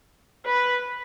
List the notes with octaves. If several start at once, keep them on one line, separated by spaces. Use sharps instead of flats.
B4